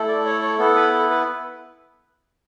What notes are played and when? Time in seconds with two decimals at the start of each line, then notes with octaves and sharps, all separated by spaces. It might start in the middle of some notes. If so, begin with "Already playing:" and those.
Already playing: A3 E4 A4
0.08 D5
0.25 C#5
0.42 C#5
0.59 B3 E4 A4
0.75 B4
0.93 A4
1.10 B4